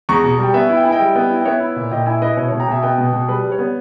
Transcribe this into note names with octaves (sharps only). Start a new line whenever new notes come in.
E2 A#5 C#6
B2
G3 G5
B3 E5 G#5
E4
G5
E4 G#5
D#5 G5
G3
B3
E4
G5
B3 C#5 E5
E4
A#2
A#2 D#5 G5
E4 E5 G#5
E4 B4 D#5
B2 C#5
B2 C#5
G5 A#5
B2 E5 G#5
B3 D#5 G5
B2
B2
G3 B4
G3
C#5
B3